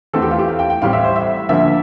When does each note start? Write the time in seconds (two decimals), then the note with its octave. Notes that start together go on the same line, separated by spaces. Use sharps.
0.13 E2 E3 A3 C4 A4
0.22 G4
0.31 F4
0.39 G4
0.48 F5
0.59 G5
0.70 G5
0.82 A1 A2 G3 C4 F5
0.93 E5
1.04 C5
1.16 E5
1.49 D2 D3 F3 A#3 E5